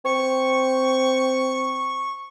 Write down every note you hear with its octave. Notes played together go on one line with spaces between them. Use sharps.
C4 C#6